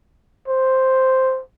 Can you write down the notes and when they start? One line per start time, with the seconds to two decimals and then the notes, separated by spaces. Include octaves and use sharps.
0.48 C5